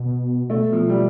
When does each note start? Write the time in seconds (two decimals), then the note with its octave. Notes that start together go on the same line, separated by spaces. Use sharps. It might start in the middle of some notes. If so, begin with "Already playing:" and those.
Already playing: B2
0.49 B2 A3
0.73 F3
0.89 G3